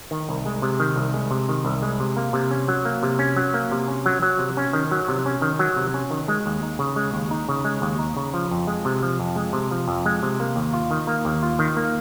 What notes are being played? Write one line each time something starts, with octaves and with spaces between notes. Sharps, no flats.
D#3
C2
G#3
C3
D#3
C2
G#3
C3
D#3
C2
G#3
C3
A#3
C3
C#4
F#3
A#3
C3
C#4
F#3
A#3
C3
C#4
F#3
F#3
C3
C#4
D#3
F#3
C3
C#4
D#3
F#3
C3
C#4
D#3
G#3
D#2
D#4
C#3
G#3
D#2
D#4
C#3
G#3
D#2
D#4
C#3
F3
F2
G#3
C3
F3
F2
G#3
C3
F3
F2
G#3
C3
A#3
D#2
F4
D#3
A#3
D#2
F4
D#3
A#3